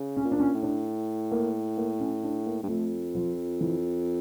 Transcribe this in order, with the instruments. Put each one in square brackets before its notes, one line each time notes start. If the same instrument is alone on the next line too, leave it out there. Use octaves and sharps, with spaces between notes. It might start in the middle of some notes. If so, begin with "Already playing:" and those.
Already playing: [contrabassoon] C#3
[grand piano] C#4
[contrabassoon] A#2
[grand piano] D4
C#4
[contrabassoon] A2
[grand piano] D4
A#3
A#3
C#4
D4
A#3
[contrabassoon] G2
[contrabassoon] F2 [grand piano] A3
[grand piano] F3
E3